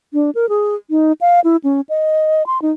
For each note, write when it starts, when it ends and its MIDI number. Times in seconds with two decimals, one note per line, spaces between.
0.13 0.30 62
0.35 0.49 70
0.49 0.75 68
0.90 1.12 63
1.21 1.40 77
1.44 1.57 64
1.64 1.81 61
1.89 2.46 75
2.46 2.60 84
2.62 2.72 63